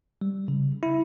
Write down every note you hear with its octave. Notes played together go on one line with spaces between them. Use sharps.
G3
C#3
E4